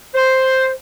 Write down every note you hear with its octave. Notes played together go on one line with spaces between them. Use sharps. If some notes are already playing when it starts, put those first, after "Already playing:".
C5